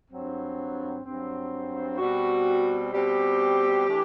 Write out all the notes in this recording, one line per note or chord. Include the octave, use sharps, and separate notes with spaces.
G2 F#3 C4
G2 F#3 C4
B2 G3 C4 F#4
B2 G3 C4 G4
E3 A3 D4